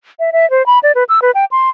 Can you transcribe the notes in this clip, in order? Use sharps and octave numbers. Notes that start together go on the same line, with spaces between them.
E5
E5
C5
B5
D5
B4
E6
B4
G5
C6